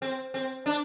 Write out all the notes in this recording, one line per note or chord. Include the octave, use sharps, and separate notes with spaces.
C4
C4
D4